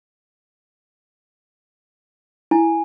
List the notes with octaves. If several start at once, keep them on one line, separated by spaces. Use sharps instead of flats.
E4 G#5